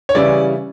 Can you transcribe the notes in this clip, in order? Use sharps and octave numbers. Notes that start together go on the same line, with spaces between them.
C#5
C#3 E3 G3 C#4 E4 D5